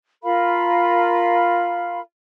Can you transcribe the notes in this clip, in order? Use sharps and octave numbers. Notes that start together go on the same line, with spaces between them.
F4 A#4 F5 B5